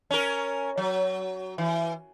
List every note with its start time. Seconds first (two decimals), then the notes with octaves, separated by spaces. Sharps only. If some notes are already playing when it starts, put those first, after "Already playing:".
0.11 C#4 A#4
0.77 F#3
1.58 E3